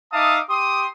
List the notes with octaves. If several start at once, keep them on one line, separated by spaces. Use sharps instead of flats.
D#4 E5 F5 A5 D6 D#6
G4 C6 D6 D#6